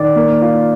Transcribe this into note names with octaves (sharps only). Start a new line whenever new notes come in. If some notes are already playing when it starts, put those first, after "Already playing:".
Already playing: D#3 D5
A#3
F4